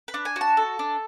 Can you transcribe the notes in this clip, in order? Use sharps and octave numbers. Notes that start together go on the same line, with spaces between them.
B4
D4
G#5
F#4
A5
A4
D4